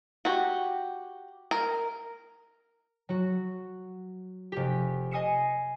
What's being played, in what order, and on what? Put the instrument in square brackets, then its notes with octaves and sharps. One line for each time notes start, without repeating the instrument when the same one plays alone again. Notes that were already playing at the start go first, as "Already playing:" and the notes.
[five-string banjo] F#4 G4
A#4
[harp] F#3 F#4
F1 G4
D#5 G#5 D#6 C7 C#7 E7